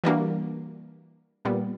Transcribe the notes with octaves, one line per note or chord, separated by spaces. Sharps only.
E3 G3 A#3 D4 F#4
A#2 G3 B3